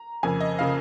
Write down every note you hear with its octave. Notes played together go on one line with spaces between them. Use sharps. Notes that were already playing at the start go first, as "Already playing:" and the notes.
Already playing: A#5
F2 C#3 A#3 G#5
D#5
C#3 A#3 F5